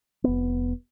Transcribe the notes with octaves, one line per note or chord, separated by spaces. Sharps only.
F1 B3